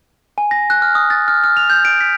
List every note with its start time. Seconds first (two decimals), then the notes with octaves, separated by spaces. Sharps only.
0.38 G#5
0.51 A#6
0.70 F#6
0.82 F6
0.95 D#6
1.10 A6
1.28 F6
1.44 F6
1.57 F7
1.70 G6
1.85 D7
2.01 B6